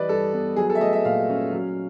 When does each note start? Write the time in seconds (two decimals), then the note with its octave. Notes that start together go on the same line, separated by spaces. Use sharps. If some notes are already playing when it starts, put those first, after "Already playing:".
Already playing: E3 G3 B4 D5 D#5
0.09 G2 A4
0.33 B3
0.56 F#3 G#4
0.70 A4
0.75 E5
0.80 A3 D#5
0.93 E5
1.05 A#2 F5
1.29 C#4
1.53 F#3